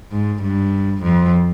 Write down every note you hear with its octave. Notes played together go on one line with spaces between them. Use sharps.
G#2
G2
F2